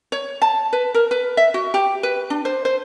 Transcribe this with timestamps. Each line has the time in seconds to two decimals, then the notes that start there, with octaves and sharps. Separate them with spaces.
0.12 C#5
0.42 A5
0.73 B4
0.94 A#4
1.11 B4
1.37 E5
1.54 F#4
1.74 G4
2.03 B4
2.30 D4
2.45 C5
2.65 C5